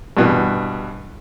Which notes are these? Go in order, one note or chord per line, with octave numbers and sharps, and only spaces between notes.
G2 B2 E3